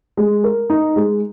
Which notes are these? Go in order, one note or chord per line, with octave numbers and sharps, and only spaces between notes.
G#3
A#4
D#4
G#3